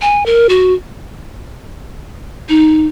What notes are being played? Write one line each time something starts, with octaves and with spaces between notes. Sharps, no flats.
G#5
A#4
F#4
D#4